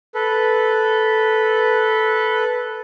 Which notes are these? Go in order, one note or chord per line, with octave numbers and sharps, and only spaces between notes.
A4 B4